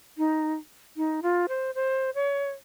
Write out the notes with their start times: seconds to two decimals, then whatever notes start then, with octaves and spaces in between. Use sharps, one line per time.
0.17 D#4
0.97 D#4
1.22 F4
1.48 C5
1.75 C5
2.15 C#5